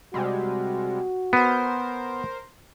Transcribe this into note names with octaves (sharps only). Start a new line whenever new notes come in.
C3 G3 G#3 F#4
B3 A#4 C5